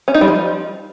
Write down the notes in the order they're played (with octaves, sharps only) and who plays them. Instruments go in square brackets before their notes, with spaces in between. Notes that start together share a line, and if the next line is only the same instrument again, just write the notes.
[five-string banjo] C#4
D#4
G3
F3